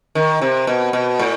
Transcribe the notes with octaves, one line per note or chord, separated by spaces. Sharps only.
D#3
C3
B2
B2
A2